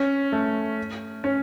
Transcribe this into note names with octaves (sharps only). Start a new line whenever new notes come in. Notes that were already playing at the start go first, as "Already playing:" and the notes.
Already playing: C#4
A3
C#4